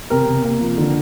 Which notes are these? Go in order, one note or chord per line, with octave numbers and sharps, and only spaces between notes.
C3 A#4
C3
A#3
F3
D3